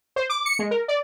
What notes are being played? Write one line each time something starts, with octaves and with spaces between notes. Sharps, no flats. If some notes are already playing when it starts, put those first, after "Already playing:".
C5
D6
C#7
G#3
A#4
D5